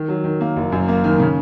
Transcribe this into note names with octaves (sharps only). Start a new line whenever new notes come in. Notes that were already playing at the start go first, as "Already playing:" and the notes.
Already playing: D#3
F#3
D#3
A#3
F#1
F#2
A#3
D#3
C#3